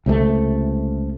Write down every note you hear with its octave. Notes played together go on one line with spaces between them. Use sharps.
C#2 C3 G3 A3